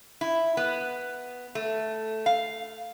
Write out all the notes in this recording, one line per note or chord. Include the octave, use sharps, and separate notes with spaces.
E4
B3
A3
F5